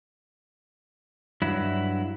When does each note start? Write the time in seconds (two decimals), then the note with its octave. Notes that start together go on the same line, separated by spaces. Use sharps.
1.42 G2 F#3 E4